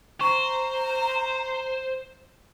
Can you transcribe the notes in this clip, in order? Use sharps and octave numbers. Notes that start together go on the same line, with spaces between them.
C5 A#5 C#6